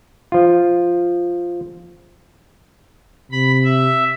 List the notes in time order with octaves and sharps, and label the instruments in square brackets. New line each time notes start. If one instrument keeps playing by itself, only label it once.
[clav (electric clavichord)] F3 F4
[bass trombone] C3 [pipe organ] B5
[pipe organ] E5